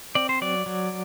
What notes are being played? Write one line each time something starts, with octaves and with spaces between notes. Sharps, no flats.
C4 D5
C5
F#3 D5
F#3